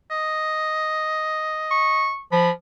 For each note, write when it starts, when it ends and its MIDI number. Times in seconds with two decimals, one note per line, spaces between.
0.11 2.10 75
1.71 2.20 85
2.32 2.50 53
2.32 2.50 83